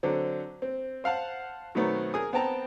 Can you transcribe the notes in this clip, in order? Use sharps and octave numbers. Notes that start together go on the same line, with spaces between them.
D3 F#3 C4
C4
C5 F5 F#5 A5
B2 D#3 F#3 A3 B3 C4
G#4 A#4 G#5 D#6
B3 C4 G5 A5 A#5